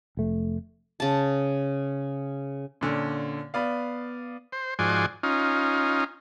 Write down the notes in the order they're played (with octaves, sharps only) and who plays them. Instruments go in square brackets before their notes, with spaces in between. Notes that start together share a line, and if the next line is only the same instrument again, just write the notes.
[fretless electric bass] F1 A3
[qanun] C#3 A5
[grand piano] A#2 D3 C#4
B3 D5 F5
[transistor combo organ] C5
G#2 F3 F#4 D5 G#5 C6
C#4 D#4 F4